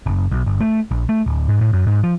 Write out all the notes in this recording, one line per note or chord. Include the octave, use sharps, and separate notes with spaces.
F#1
B1
G1
A3
A#1
A3
D1
G#2
A2
F#2
G#2
F3